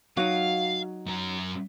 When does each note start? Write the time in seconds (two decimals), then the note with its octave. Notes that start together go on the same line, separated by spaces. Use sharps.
0.17 F#3 D#4 F#4 F5
1.07 F#2 A#4